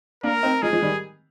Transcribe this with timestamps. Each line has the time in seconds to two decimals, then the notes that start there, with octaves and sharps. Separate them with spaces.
0.23 A#3 D4 A#4
0.43 C4 D#4
0.62 F3 G#3 G#4
0.73 F3 G#3
0.82 D#3 G3